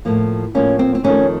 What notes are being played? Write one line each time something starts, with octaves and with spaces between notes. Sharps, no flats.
A2 F3 A#3
A2 F3 A#3 C#4
C4
C4
F2 D#3 A3 C#4